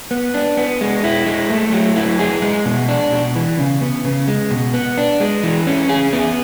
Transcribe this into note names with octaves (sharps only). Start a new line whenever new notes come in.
B3
D4
B3
G#3
E4
G#3
A3
F#3
E4
G#4
G#3
B2
D4
B2
E3
C#3
B3
C#3
G#3
B2
B3
D4
G#3
E3
C#4
G#4
B3